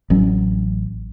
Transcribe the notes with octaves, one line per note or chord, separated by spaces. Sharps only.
A1 F#3 C#4